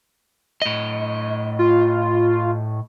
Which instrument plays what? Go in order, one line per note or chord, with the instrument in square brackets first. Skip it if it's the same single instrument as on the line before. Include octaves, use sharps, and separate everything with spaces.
[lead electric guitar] A2 D#5
[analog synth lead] F4